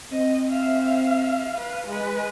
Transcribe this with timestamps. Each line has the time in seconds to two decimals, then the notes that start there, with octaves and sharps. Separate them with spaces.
0.12 C4 D#5
0.50 E5 F5
1.58 B4 F5
1.88 G#3 B4